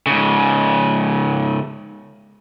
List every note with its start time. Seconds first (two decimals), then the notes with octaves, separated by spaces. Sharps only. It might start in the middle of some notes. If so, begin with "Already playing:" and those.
0.07 G#2 C#3